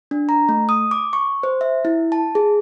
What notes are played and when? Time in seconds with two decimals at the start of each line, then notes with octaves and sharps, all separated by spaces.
0.11 D4
0.29 A#5
0.49 A3
0.69 D#6
0.91 D6
1.13 C#6
1.43 C5
1.61 E5
1.85 E4
2.12 A5
2.35 G#4